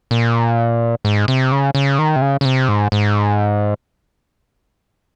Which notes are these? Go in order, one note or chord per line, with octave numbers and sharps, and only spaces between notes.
A#2
G#2
C3
C#3
C#3
D#3
C3
C#3
C#3
C3
G#2
G#2